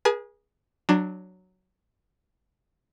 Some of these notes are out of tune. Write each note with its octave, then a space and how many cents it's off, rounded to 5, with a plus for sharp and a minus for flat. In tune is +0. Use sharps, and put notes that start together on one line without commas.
G#4 -10 B4 -45 G#5 +40
F#3 +0 D4 +15